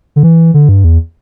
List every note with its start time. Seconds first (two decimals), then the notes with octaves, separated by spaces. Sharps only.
0.16 D3
0.23 E3
0.54 D3
0.69 G2
0.84 E2